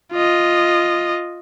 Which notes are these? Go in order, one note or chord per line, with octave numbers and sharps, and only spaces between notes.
F4 D#5